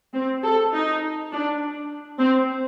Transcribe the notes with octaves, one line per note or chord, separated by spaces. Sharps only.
C4
A4
D#4
D4
C4